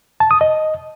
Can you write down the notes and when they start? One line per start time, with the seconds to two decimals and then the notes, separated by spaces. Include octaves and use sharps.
0.20 A5
0.31 D#6
0.41 D#5